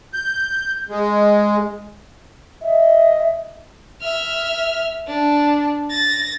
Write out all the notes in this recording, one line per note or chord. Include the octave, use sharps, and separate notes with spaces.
G6
G#3
D#5 E5
E5 F6
D4
A6 A#6